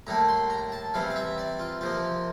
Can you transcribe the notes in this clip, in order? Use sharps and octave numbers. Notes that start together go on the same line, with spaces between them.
A2 G3 A#3 D4 A#5
C6
A#5
A5
C3 E3 G3 F5
F5
E5
D5
F4
C3 F3 A#3 F4